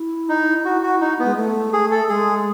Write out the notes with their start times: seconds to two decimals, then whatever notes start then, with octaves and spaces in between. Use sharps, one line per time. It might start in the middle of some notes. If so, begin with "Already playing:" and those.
Already playing: E4
0.29 D#4
0.65 F#4
0.83 F#4
1.01 D#4
1.19 B3
1.25 G#3
1.36 A3
1.73 G#4
1.91 A4
2.09 G#3 G#4